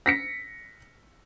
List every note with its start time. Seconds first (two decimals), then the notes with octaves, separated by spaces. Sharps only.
0.06 A#6 B6 C#7